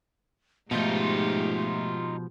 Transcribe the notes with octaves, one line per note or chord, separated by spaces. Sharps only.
G#2 B2 F3 G#3 A3 D#4 F4 G4